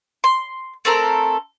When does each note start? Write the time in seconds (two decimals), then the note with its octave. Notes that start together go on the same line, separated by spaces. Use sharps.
0.24 C6
0.85 A3 C4 A4 A#4